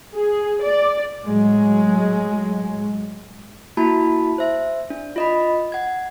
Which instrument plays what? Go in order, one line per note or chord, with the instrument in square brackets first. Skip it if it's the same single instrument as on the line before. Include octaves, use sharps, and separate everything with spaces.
[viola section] G#4
D5
[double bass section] A2 F#3 G#3
[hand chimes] A#3 E4 F#4 A5 B5
C5 E5
D4
F4 D#5 B5
F#5 G#6